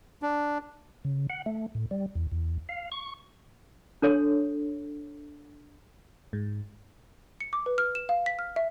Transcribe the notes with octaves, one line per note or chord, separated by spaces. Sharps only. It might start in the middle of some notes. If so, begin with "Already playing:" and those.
D4
C#3
F#5
A3
A2
G3
E2
E2
F5
C#6
D4 A4 C#5
G#2
C#7
D6
B4
F6
E7
F5
B6
F6
E5